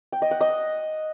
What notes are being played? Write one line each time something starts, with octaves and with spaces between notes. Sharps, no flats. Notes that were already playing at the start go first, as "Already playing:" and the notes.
G5
D#5
F#5
D#5